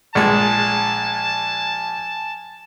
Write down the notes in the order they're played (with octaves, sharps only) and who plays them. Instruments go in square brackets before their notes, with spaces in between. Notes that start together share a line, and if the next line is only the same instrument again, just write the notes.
[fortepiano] A#1 G#3 [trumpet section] G#5 A5